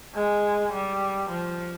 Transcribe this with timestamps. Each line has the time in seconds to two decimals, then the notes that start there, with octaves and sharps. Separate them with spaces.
0.15 G#3
0.72 G3
1.29 F3